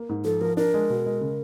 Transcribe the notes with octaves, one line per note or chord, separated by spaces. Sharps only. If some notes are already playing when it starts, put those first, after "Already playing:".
Already playing: A#3
G#2
F3 A4
F3 A#4
D4 A#4
G#3
B2
G#3
C#3